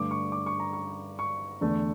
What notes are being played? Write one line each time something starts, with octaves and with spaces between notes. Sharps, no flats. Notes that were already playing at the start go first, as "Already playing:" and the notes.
Already playing: G2 D3 A3 D6
C#6
D6
C#6
A#5
C#6
C#6
E2 D3 A3